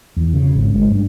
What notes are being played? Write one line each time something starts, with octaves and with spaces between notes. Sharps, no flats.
E2
C#3
G#1
G#3
G2